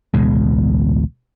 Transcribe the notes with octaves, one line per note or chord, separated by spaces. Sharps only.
A1 D2 B2 G#3